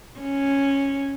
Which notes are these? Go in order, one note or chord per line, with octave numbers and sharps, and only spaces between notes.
C#4